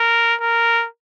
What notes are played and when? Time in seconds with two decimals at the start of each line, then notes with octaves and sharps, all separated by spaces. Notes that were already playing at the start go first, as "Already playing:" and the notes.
Already playing: A#4
0.40 A#4